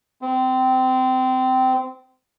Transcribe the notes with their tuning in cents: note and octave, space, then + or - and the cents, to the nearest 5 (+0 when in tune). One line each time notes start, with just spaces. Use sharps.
C4 -25